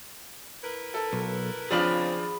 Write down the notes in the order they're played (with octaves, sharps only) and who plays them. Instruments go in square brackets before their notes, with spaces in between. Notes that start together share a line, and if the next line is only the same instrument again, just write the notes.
[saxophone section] E4 A#4 B4
[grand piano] A4
[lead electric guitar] B1
[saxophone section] C#3 C4 [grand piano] F3 D4 F4 [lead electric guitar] G#4 B5